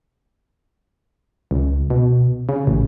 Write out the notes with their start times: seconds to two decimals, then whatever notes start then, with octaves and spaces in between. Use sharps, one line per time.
1.51 C#2
1.90 B2
2.49 C#3
2.67 A1